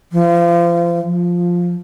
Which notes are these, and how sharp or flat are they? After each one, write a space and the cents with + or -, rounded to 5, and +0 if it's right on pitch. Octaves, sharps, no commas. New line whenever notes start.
F3 -30
F3 +5